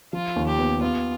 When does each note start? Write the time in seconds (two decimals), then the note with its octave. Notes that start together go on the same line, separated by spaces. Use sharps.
0.13 F3 F4
0.36 D#2
0.47 G4
0.59 B3
0.81 B3 F4